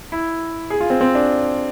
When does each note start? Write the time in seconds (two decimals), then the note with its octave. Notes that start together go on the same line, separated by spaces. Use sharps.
0.12 E4
0.70 G#4
0.81 F4
0.90 C4
1.01 C4
1.15 D4